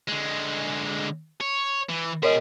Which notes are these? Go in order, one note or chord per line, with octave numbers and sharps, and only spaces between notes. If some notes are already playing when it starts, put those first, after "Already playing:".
D3 G#3
C#5
E3
B2 G#4 A#4 C#5 D#5